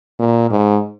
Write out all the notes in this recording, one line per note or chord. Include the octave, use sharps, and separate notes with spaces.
A#2
G#2